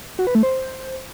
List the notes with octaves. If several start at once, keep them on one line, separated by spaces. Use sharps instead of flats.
F#4
B4
A3
C5